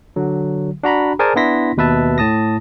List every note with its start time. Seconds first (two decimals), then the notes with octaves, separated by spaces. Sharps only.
0.16 D3 F#3
0.83 D4 F#4 A#5 B5
1.19 G#4 A#4 C5 D5 G#5 A5
1.36 B3 D4 E4 C6 A#6 B6
1.77 D#2 B2 B4 E5 A5
2.18 A2 A5 D#6 A#6